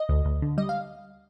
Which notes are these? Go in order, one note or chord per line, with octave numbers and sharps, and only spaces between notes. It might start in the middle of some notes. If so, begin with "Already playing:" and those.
Already playing: D#5
D2
D2
D3
G3 D#5
F5